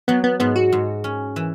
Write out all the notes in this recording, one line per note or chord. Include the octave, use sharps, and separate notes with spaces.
F#3 B3
B3
G#2 B3
F#4
G#2
C#4
E3